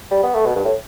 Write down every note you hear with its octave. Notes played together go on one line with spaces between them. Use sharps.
G3
B3
A3
B2
G2
A2